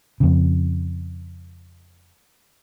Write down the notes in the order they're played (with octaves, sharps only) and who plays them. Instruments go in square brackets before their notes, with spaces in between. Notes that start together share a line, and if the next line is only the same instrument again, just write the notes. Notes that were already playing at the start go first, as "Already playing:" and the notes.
[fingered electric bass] F2 C#3